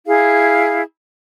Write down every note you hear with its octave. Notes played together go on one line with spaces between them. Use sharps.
E4 G#4 F5